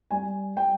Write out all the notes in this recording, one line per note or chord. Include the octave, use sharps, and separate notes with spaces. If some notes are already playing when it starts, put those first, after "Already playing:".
G3 G#5
G3 G5